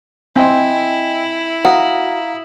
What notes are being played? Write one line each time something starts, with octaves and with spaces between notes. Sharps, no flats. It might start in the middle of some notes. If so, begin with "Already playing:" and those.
C4 E4 D#5 G5 G#5
F#4 F5 A#5 D#6